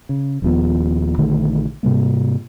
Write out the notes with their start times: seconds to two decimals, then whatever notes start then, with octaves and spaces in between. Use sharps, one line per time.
0.09 C#3
0.42 D#1 D#2 F3 B3
1.18 A#1 D3 D#3 A3
1.83 G#2 C3 G3 A#3